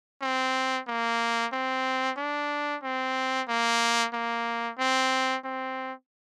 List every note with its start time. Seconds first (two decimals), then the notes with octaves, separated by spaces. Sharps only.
0.21 C4
0.87 A#3
1.53 C4
2.17 D4
2.83 C4
3.48 A#3
4.13 A#3
4.78 C4
5.44 C4